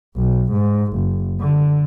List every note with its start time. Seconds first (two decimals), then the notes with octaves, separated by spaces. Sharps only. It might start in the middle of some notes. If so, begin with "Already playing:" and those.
0.16 B1
0.52 G#2
0.93 F#1
1.40 D3